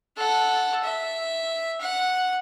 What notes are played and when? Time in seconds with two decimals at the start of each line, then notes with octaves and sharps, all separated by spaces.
0.17 A4 F#5
0.84 E5
1.81 F#5